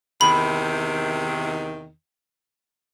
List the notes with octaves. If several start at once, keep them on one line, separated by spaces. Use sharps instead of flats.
E2 C3 D#3 B5